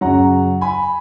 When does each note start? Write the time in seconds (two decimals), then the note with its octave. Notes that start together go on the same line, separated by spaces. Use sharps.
0.01 F#2 C#3 F#3 F#5 A#5
0.61 G#5 B5